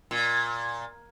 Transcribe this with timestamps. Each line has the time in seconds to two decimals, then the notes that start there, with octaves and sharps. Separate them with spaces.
0.11 A#2